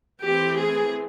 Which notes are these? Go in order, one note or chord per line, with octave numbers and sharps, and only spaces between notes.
E3 A3 C4 G4
G#4